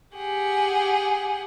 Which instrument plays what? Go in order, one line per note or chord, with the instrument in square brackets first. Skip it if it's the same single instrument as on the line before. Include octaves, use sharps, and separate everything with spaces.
[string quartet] G4 G#4 F#5